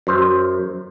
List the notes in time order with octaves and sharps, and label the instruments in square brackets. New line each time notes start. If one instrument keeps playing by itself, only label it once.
[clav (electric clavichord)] F#2 C5